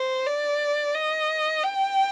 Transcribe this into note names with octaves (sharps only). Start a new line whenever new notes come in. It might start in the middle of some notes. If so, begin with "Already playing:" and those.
Already playing: C5
D5
D#5
G5